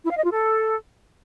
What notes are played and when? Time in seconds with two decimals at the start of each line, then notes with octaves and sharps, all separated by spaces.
0.03 E4
0.10 F5
0.17 D#5
0.23 F4
0.30 A4